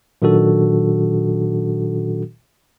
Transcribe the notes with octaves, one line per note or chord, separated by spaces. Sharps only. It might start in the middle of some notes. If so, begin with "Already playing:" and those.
A#2 D#3 F#3 D4 F#4 A4